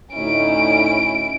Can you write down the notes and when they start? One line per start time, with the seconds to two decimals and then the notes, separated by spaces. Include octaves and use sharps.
0.14 D2 A2 C#4 D#4 E4 D7